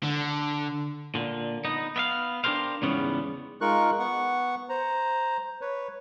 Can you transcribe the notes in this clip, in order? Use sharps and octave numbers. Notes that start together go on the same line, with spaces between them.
D3
A#2 D3
B3 D#4
B3 E5 F5
D4 G4 A4 A#4 C5 F5
E2 G#2 C#3 G3 B3 C#4
G#3 D#4 F4 A#4 C#6 F#6
B3 F#5 C#6
C5 A#5
B4 C#5